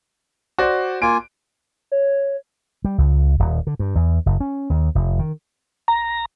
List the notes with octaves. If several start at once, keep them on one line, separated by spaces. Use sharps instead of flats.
F#4 C5 D5
A#3 F4 G#5 D7
C#5
G3
C#2
D#1
D3
G2
E2
F#1
C#4
D#2
F1
D#3
A#5